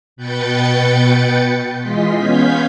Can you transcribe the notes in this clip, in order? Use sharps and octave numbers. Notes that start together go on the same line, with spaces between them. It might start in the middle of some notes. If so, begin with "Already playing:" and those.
B2 B4 G5 G6 A6 C#7
E3 G#3 F4 D#5 C6 B6
B3 C#4 F5 G6 G#6 B6